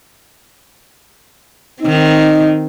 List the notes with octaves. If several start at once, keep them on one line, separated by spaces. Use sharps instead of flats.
D#3 C4 D#4